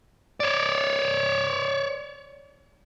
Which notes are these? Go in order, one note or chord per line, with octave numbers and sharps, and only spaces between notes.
C#5 D5